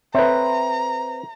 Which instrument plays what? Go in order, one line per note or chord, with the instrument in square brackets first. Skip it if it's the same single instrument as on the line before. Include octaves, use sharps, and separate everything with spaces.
[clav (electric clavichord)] C4 B4 [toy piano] A4 C#5 E5 [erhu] A#5